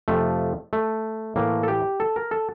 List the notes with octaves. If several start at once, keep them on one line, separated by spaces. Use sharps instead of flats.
F2 C3 F3 A3
A3
A2 E3 A3 A#3
A4
G4
A4
A#4
A4